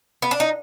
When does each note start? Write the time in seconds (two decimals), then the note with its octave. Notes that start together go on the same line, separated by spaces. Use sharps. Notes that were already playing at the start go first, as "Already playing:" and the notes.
0.22 B3
0.31 D4
0.40 D#4